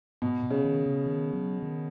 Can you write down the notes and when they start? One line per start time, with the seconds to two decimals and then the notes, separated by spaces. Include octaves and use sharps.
0.22 G#2 B2
0.43 B2
0.50 C#3
0.64 D#3
0.86 C#3
1.06 D#3
1.33 F#3
1.62 D#3